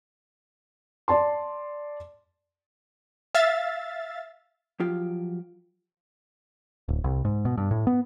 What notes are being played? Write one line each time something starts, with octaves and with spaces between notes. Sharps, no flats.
D5 A5 C6
E5 F5 A6
F3 F#3 F4 G4
D1
C2
G#2
B2
G2
A2
B3